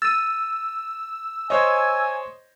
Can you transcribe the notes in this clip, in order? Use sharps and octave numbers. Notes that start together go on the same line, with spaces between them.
E6 A6 D#7
C5 C#5 D#5 G#5